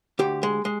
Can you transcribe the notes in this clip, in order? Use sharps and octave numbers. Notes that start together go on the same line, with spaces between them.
D2 G4
G#3
G#3